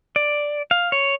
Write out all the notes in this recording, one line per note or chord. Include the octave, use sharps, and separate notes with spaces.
D5
F5
C#5